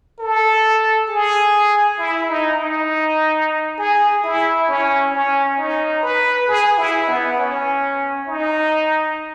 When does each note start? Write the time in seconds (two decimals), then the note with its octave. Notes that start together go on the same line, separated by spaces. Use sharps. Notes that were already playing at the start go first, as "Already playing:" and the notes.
0.19 A4
1.09 G#4
1.99 E4
2.29 D#4
2.59 D#4
3.79 G#4
4.24 E4
4.69 C#4
5.13 C#4
5.58 D#4
6.03 B4
6.48 G#4
6.78 E4
7.08 B3
7.38 C#4
8.28 D#4